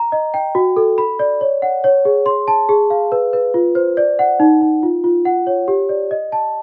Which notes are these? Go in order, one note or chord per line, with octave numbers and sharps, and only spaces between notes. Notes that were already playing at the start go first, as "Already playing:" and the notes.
Already playing: A#5
D#5
G5
F#4
A4
B5
D5
C#5
F#5
C#5
G#4
C6
A5
G#4
F5
B4
B4
F4
C5
D5
F#5
D#4
D#4
F4
F4
F#5
C#5
G4
D5
D#5
A5